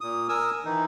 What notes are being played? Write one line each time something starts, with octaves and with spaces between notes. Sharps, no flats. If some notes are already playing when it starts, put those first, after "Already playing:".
A#2 D#6
A#4 G#5 D#6 E6
D#3 E3 D#4